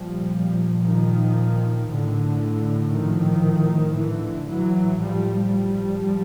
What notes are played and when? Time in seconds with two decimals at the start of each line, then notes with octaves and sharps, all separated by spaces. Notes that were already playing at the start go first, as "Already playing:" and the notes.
Already playing: A#2 F3 G3
0.83 D#3 F3
1.88 A2 D3
2.92 D#3 F3
3.97 A2 D3 E3
4.50 E3 F#3
5.01 F3 G3
5.54 F3 G3